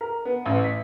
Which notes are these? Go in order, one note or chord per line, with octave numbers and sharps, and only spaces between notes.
A#4
B3
A1
B6